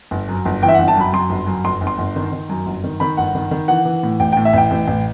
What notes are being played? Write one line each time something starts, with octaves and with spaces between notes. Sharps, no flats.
G1
F#2
G1
E3 G5
E5
F#5
G1
A5
F#2 B5
F#2 C6
G1
F#2
G1 C6
G1
C6
G1
D#3
D#3
F#2
G1
D#3
D#3 B5
G1 F#5
D#3
D#3
E3 F#5
E3
A2
A1 G5
G5
A2
E5
A1 G5
A1
A1